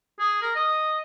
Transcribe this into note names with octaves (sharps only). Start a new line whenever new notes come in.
G#4
A#4
D#5